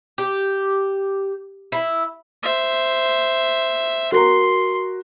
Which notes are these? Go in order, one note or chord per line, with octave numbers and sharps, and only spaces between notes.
G4
E4
C5 E5
F#4 A#4 A#5 C6